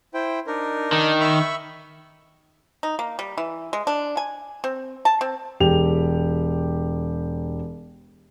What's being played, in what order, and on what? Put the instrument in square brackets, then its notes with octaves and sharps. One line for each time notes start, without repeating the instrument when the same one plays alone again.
[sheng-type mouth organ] E4 C5 G5
D4 D#4 A#4
[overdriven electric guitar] D#3
[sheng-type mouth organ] E5 B5 C#6
[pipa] D#4
A#3
G3
E3
G#3
D4
G#5
C4
A5
C4
[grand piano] E1 G4 F7